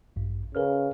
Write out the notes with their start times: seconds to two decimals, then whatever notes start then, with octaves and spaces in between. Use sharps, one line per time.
0.16 A1 G2
0.55 C#3 A#4 B4 F6